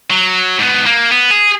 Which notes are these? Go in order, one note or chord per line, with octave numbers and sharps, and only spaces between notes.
F#3
G#2 B3
A#3
B3
G#4